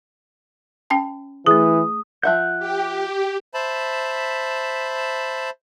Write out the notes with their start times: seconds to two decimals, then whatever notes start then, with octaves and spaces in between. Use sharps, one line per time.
0.90 C#4 G5 A5
1.46 E3 A3 G#4 D#6
2.23 F3 E5 F#5 F#6 G6
2.59 G4
3.54 C5 E5 A5 B5